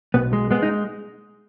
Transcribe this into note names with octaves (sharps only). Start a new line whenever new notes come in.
B1 B3
G#3
G#3 B3
D#4